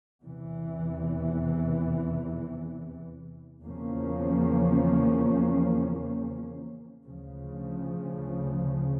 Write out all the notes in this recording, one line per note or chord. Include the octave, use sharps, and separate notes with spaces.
E2 C3 E3
E2 C#3 F3 A#3 C#4
D2 C#3 F3